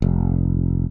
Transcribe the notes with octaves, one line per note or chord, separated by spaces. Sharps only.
F1